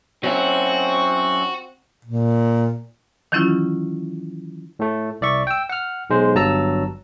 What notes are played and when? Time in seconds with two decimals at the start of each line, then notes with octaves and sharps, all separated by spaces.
0.24 F#3 C4 C#4 E4 F#4
2.05 A#2
3.32 D#3 E3 F#3 C#4 E4 F4
4.79 A2 A3
5.21 C2 D5 E5 C#6
5.47 G5 E6
5.69 F#5 F6
6.10 B1 G#3 C5
6.35 G1 G2 F#3 A5 A#5 E6